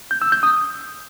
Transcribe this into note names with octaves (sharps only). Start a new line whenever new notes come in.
G6
E6
G6
D#6